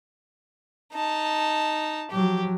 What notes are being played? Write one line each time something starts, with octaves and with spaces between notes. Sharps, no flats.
D#4 A5
F3 F#3 G4